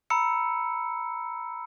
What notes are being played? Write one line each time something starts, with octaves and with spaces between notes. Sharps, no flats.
A#5 B5 E6 C#7